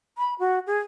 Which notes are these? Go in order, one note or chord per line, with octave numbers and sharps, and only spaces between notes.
B5
F#4
G#4